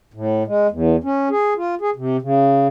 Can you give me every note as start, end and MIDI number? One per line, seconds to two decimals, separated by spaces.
0.14 0.43 45
0.47 0.67 56
0.71 0.96 40
1.04 1.29 61
1.30 1.54 68
1.57 1.75 65
1.81 1.90 68
1.96 2.17 48
2.22 2.67 49